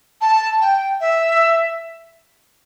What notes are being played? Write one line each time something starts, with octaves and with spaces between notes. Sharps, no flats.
A5
G5
E5